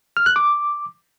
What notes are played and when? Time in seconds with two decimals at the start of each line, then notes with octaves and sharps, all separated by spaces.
0.17 F6
0.26 F#6
0.36 D6